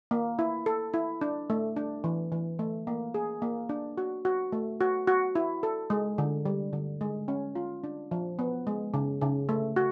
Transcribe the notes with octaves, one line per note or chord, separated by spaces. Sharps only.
A#3
E4
A4
E4
D4
A3
D4
E3
E3
A3
A#3
G#4
A#3
D4
F#4
F#4
A3
F#4
F#4
E4
A4
G#3
D3
G3
D3
G#3
C#4
F4
D4
F3
B3
G#3
C#3
C#3
A3
F#4